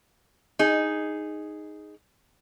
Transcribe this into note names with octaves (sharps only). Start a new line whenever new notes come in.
D#4 G#4